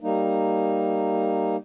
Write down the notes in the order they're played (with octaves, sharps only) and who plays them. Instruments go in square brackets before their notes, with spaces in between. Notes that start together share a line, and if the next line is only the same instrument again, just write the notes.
[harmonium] G3 A#3 D#4